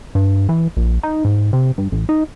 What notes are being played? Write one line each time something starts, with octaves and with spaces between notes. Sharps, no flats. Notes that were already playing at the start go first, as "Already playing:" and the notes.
G2
E3
A#1
D#4
G#2
C3
G2
A1
D#4